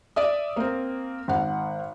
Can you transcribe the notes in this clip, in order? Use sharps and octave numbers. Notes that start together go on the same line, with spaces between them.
D5 E5 D#6
A#3 C4
G#1 F#5